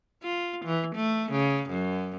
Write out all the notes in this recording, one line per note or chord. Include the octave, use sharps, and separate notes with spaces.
F4
E3
A3
C#3
F#2